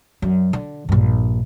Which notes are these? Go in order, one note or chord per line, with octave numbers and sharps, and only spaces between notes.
F#2 D3
D3
A#1 G2